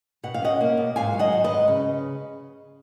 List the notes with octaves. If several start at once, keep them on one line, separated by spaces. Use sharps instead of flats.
B2 F#5
F5
C#4 D#5 F#5
A#3
B2
G#2 F5 G#5
F#3
D#5 F#5
D#3
B4 D#5
G#2
C#3